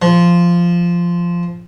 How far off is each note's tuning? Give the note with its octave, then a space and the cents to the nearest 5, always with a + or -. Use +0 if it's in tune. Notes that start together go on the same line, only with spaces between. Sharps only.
F3 -10